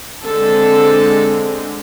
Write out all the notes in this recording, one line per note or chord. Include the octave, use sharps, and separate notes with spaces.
D3 G#3 C4 A4